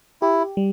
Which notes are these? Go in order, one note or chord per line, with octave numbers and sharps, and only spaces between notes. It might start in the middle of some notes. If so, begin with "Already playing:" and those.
E4 G4
G3